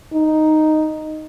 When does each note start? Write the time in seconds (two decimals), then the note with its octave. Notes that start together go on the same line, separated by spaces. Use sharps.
0.13 D#4